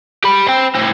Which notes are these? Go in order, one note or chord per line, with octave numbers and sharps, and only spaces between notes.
G4 B5
C5 G5
A2 C4